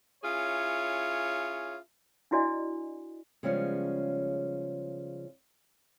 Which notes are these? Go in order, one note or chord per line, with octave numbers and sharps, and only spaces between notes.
C#4 E4 F4 G#4 C#5
D4 E4 F#4 D5 D#5 G#5
C#3 F3 G3 G#3 B3 C#4